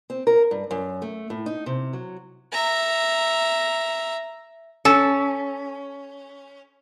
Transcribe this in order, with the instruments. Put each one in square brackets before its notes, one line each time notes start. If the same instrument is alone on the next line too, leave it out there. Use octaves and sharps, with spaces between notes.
[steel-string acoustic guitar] C4
A#4
G2
F#2
A3
A2
D#4
C3
F#3
[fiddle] E5 A#5
[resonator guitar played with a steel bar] C#4 [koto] A4